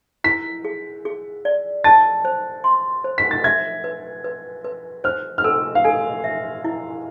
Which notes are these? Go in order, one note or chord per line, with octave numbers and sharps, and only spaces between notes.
E4 B6
G#4
G#4
D5
A5 A6
C5
C6
C5
B6
A6
E5 G#6
B4
B4
B4
C5 F6
F6
A4 E6
F5
A4 G#5
E5
E4